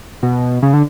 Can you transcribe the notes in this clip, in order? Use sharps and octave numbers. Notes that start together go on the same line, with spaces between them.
B2
C#3
D3